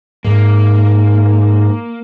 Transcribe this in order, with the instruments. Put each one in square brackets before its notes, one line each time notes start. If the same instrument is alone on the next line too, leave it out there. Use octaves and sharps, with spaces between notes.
[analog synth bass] G#2 [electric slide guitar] A#3